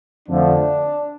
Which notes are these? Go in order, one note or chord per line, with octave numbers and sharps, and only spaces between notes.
F2 D3 F3 A3 D4